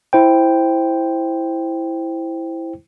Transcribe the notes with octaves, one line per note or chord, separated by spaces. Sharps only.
E4 C5 G5